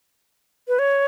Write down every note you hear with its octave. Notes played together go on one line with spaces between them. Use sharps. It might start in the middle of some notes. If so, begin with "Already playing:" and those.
B4
C#5